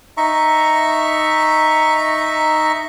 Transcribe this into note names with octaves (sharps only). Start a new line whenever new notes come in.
D#4 E5 A#5 C#6